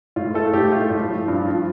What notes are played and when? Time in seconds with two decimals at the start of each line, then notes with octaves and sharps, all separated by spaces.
0.16 A2 F4
0.34 A3 A4
0.53 A2 G4
0.72 A3 F4
0.90 A2
1.08 F3
1.28 G2
1.46 F3